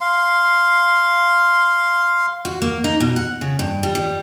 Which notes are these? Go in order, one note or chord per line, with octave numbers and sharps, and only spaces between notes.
F5 C6
F#4
A#3
D#4
B2
F#5
C#3
G2
G3
G3